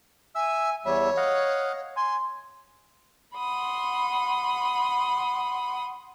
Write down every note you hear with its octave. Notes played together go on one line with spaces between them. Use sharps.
E5 G#5 E6
E2 G3 C#5 E5
D#5 F5 F#5
G#5 C6
F#5 B5 C6 D#6